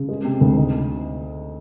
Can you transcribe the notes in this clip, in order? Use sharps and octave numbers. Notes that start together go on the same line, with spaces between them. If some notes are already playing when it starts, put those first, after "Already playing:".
Already playing: C#3
G#3
C3
D2
D#4